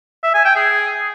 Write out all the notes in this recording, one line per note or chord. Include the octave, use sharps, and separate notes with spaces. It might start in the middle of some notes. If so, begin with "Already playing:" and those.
E5
G#5
G5
G#4